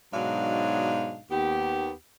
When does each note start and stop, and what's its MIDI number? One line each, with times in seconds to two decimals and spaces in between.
0.13 1.21 44
0.13 1.21 47
0.13 1.21 54
0.13 1.21 62
0.13 1.21 63
0.13 1.21 77
1.31 1.91 39
1.31 1.91 59
1.31 1.91 67